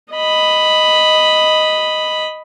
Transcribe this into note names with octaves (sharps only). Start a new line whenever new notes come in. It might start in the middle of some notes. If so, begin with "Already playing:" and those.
D#5 B5